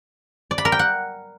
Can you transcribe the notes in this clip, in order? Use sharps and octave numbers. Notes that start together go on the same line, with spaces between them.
D5
B5
A#4
G5
F#5